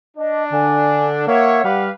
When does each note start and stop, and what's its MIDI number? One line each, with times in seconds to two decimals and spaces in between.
0.17 1.26 62
0.17 0.44 75
0.52 1.23 50
0.52 1.06 80
1.27 1.62 58
1.27 1.64 73
1.27 1.64 76
1.27 1.83 78
1.64 1.90 55
1.64 1.91 67
1.64 1.91 71
1.64 1.91 77